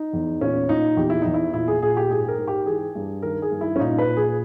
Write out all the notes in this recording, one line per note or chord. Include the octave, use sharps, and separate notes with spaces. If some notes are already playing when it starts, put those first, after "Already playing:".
Already playing: D#4
E2
A#2 C#4
A#2 D#4
E2 G4
E4
E2 D#4
E4
A#2 E4
G#4
A#2 G#4
G4
G#2 G#4
A#4
G#2
G4
E3 G#4
G2
D#3 A#4
G#4
G2
E4
C#4
A#2 D#4
B4
A#2
G#4